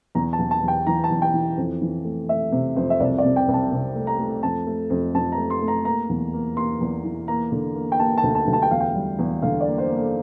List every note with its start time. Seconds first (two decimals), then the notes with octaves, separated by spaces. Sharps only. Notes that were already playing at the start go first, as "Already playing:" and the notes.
0.15 E2 A#5
0.33 A5
0.39 E2
0.51 A5
0.62 E2
0.68 G5
0.87 E3 A#5
1.04 A5
1.10 E2
1.22 G5
1.34 E3
1.57 F2
1.82 E3
2.05 A3
2.29 A3 E5
2.52 C3
2.76 F2 C5
2.90 E5
3.00 C2 D5
3.18 D5
3.25 C3
3.36 G5
3.48 C2
3.54 A5
3.72 C3
3.96 A3
4.07 A#5
4.19 A3
4.43 F2 A5
4.67 A3
4.90 F2
5.14 F2 A5
5.32 A#5
5.37 A3
5.50 C6
5.62 A3
5.68 A#5
5.85 A#3 A#5
6.09 E2
6.33 A#3
6.57 A#3 C6
6.81 E2
7.04 E3
7.28 A#3 A#5
7.52 D3
7.75 A#3
7.92 G5
8.00 A#3 A5
8.18 A5
8.23 D2
8.35 A5
8.47 D2
8.53 A5
8.62 G5
8.71 E2 F5
8.80 G5
8.95 G3
9.19 E2
9.42 D3 F5
9.61 D5
9.67 A#3
9.78 C5
9.90 A#3
9.96 A4